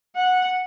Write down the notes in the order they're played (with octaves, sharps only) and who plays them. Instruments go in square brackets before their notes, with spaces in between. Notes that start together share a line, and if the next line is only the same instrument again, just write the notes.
[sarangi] F#5